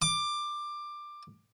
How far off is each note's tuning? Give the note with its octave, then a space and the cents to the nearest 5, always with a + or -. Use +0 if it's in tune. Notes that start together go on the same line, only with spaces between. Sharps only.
D6 +15